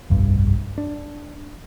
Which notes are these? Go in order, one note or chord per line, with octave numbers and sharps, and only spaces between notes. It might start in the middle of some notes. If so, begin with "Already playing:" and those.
F1 B1 G2
D4